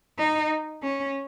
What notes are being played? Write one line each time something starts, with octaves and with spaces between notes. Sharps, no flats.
D#4
C#4